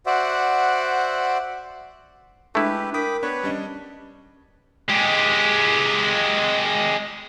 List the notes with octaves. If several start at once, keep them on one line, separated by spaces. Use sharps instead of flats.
F#4 C5 D5 E5 F#5
G#3 A3 D4 E4 G4 B4
A#4 G5 B5 D6 D#6 B6
B3 D4 B4 C#5 B5
G3 C#4 D4 D#5
G#3 G4